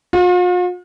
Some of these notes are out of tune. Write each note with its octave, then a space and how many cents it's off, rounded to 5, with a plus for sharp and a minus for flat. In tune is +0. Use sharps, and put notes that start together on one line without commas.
F4 +45